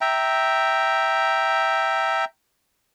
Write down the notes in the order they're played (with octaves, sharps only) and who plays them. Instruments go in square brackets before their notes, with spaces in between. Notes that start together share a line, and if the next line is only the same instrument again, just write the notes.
[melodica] E5 G5 A#5